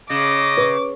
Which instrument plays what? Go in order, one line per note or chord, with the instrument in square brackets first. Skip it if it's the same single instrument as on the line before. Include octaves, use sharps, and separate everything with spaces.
[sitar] C#3 [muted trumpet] D#5 [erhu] D6
[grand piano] B4